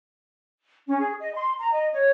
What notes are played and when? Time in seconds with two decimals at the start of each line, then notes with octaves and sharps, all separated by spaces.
0.87 C#4
0.99 G#4
1.19 D#5
1.34 C6
1.59 A#5
1.73 D#5
1.93 C#5